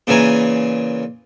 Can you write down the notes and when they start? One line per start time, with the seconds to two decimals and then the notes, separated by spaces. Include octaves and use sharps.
0.07 A#2 C#3 E3 G#5 A#5